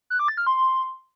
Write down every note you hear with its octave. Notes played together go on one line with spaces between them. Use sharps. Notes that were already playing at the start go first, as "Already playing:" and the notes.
F#6
D6
A6
F6
C6